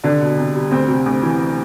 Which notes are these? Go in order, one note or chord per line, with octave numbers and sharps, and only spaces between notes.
C2 D3 D4
B2
C2
G3
D2 C4
C3
D2
E3